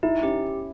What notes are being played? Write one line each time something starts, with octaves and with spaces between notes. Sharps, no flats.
D#4 E4
C#4 G4